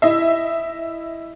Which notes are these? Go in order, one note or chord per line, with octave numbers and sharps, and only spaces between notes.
E4 D#5 E5